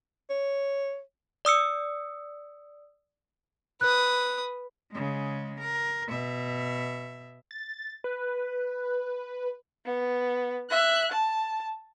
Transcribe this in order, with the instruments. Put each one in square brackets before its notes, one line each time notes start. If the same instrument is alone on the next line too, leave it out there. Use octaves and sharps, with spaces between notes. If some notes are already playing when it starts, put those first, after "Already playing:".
[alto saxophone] C#5
[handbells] D5 D#6 E6 C#7
[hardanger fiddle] B4 D#6 [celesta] F#6
[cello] C#3 G#3
A#4
B2 E5
[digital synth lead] A6
B4
[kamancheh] B3
E5 F#6
A5